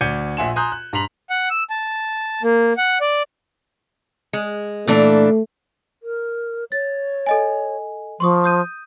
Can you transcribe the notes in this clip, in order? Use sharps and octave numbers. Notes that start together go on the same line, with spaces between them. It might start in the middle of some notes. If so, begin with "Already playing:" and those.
D2 D5 G6 G#6 C#7 D#7
A#1 E5 F#5 G#5 C6 E7
G#5 A#5 C6 D#6 F#6 G6
F#6
G2 A#5 C6 B6 F7 F#7
F#5
E6
A5
A#3
F#5
D5
G#3
A#2 E3 A3 D4
A#4
C#5 A6
A4 D#5 G#5
F3 C6 C#6 D#6
D#6 G6 D#7